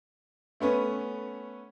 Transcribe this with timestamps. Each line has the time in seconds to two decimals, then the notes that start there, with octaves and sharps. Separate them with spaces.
0.60 A3 B3 C#4 B4